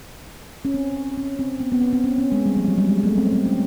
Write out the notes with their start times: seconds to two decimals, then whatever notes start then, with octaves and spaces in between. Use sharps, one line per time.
0.65 C#4
0.74 C4
1.18 C#4
1.39 C4
1.60 B3
1.72 B3
1.81 C4
1.93 C4
2.04 C#4
2.18 C#4
2.32 G#3
2.46 G3
2.56 F3
2.68 F#3
2.78 G3
2.89 G#3
3.03 A3
3.18 C4
3.33 C4
3.46 C#4